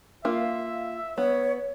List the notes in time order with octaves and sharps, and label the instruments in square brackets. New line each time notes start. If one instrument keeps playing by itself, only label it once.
[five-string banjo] A#3 F4 [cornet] E5
[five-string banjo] B3 [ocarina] C#5